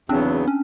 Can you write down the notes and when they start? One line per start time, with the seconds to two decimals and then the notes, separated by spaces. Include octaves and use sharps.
0.09 E2 C#3 F#3 B3 C4 D4
0.48 C#4